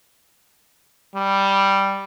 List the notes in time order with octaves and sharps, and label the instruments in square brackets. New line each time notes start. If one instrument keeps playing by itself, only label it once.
[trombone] G3